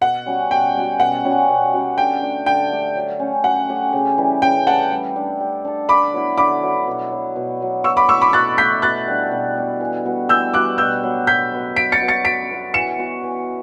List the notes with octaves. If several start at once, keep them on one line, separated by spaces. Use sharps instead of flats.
B2 F#5
G3 C#4 F#4
B2 G5
G3 C#4 F#4
B2 F#5
G3 C#4 F#4
B2
G3 C#4 F#4
D3 G5
A3 D4 G4
D3 G5
A3 D4 G4
F#3
A3 C#4 G4
F#3 F#5
A3 C#4 G4
C#3
E3 G3
C#3 G5
E3 G3 F#5 A5
G3
D4 A4
G3
D4 A4
D3 B5 D6
F#3 B3 E4
D3 B5 D6
F#3 B3 E4
B2
F#3 B3
B2
F#3 B3
B2 C#6 E6
B5 D6
A3 E4 C#6 E6
B5 D6
B2 F#6 A6
A3 E4 G6 B6
B2 F#6 A6
G3 B3 D4
B2
G3 B3 D4
E3
G3 B3 F#4
E3 E6 G6
G3 B3 F#4 D6 F#6
B2 E6 G6
F#3 B3
B2 G6 B6
F#3 B3
F#3 B6 D7
A6 C#7
B3 F#4
A6 C#7
F#3 B6 D7
B3 F#4
E3 C#7 E7
B3 F#4
E3